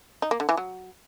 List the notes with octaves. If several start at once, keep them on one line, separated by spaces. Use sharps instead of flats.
D#4
A#3
D3
E3
F#3